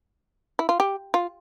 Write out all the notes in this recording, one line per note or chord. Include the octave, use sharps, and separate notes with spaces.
E4
F4
G4
F4